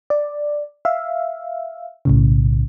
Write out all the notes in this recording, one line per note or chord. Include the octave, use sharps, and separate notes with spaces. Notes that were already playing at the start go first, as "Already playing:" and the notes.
D5
E5 F5
B1 A2 C#3